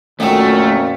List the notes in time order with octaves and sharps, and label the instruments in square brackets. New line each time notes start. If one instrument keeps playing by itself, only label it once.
[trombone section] F2 A#2 C#4 [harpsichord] D#3 F#3 [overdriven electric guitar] A3